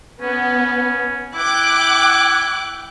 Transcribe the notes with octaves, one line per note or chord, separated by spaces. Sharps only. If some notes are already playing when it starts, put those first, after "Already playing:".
B3 C#4
E4 G5 D6 F#6